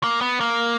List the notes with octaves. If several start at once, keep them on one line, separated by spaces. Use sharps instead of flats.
A#3
B3
A#3